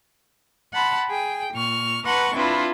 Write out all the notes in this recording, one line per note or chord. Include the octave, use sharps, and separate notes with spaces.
F#5 A5 B5 C6
G#4 G5
A#2 C#6 F6
B4 F#5 A5 A#5 C6 C#6
C4 D4 E4 F4 B4